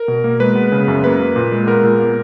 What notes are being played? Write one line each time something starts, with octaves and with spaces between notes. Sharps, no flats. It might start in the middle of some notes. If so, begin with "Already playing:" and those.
Already playing: A#4
B2
A#3
G#3 B4
B3
C#3
F#2
A#3 B4
A#3
A#2
G#3
B3 A#4
A#2
A#3